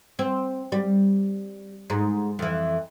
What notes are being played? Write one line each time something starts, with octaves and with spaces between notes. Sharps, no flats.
C4
G3
G#2
F2 E3